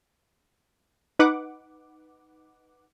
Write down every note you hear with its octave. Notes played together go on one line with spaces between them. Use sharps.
D#4 B4 F#5 D6